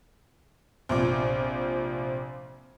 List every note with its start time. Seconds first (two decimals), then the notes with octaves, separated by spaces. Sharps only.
0.89 A#1 C3 F4 D6